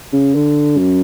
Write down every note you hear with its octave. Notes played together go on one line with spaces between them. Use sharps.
C#3
D3
F#2